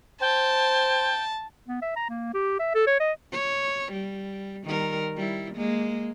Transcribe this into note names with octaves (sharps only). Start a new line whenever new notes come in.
C5 G5 A5
B3
E5
A#5
A#3
G4
E5
A4
C#5
D#5
C#5
G3
D#3 G3 A#4
G3 E4
G#3 A#3